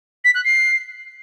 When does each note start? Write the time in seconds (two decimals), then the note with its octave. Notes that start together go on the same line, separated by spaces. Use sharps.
0.24 B6
0.35 F#6
0.45 C7